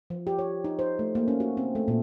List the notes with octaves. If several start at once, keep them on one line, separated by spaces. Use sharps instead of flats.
F3
G4
C#5
D#4
C5
A3
A#3
C#4
F#4
C4
A3
A#2